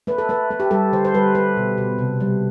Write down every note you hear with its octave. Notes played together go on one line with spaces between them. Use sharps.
A3 B4
A4
A3 B4
A3
G4
G3 A4
D3 C5
C5
G3 B4
A3 B4
B2
B2
C3
G3